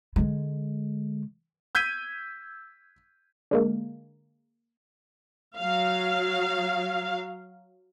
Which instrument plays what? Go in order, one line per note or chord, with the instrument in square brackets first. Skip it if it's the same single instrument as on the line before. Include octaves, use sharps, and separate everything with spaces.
[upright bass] D3 G#3
[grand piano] E6 G6 G#6 B6 D#7
[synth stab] D3 G#3 A#3
[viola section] F#3 F5